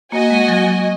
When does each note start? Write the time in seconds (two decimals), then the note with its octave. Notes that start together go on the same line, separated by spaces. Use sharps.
0.12 A#3 F#4 D#5 G#5
0.30 G#3
0.48 F#3
0.66 F#3